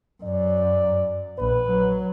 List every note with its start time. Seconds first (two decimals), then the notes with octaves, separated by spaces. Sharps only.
0.23 F#2 D5
1.38 A#1 B4
1.70 F#3